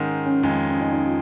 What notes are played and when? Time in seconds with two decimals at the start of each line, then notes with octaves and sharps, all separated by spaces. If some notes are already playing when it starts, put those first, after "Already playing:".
Already playing: G#2 D#3 G#3 C#4
0.26 C#4
0.43 F2 D#3 G#3
0.51 C#4
0.69 C#4
0.80 D#4
0.92 D#4
1.05 F4